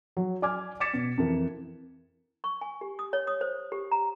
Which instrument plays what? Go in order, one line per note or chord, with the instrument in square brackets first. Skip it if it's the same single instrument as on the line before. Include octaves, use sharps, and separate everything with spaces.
[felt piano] F#3
D5 G#5 D6 F6 G#6
D6 G#6 A6 B6 C#7 E7
B2
F2 E3 A#4
[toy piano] C#6
G#5
G4
D#6
C#5
D#6
C5
G4
A#5